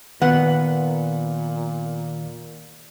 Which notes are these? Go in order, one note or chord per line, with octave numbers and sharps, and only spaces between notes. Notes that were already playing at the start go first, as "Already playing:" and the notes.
A#2 D#3 B3 F#5